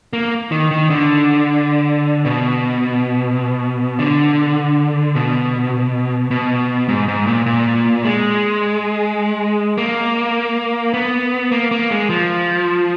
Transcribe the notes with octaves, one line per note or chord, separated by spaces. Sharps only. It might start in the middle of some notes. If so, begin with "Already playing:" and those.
A#3
D#3
D#3
D3
B2
D3
B2
B2
G#2
G#2
A#2
A#2
G#3
A#3
B3
A#3
A#3
G#3
F3